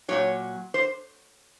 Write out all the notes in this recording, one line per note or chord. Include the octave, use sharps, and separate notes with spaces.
A#2 F#3 C#5
C5